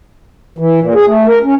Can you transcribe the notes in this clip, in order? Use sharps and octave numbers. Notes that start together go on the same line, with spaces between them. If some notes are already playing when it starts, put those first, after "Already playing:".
E3
A#2
G#4
A3
A#4
C#4